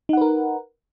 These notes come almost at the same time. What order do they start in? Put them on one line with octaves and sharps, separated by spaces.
D#4 F#5 B4 A#4